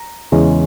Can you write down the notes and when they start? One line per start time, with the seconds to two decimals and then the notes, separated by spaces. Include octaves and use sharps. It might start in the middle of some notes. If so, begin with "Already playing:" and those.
Already playing: A#5
0.32 E2 C#3 E3 G#3 C#4